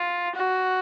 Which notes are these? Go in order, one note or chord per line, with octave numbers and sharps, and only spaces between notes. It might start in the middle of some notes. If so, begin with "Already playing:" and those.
Already playing: F4
F#4